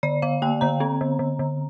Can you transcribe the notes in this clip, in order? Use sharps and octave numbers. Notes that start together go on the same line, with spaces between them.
D3 D5
D3 F5
A#3 G5
D3 A#5
C4
D3
D3
D3